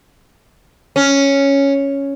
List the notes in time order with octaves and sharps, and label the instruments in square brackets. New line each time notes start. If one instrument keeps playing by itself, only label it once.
[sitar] C#4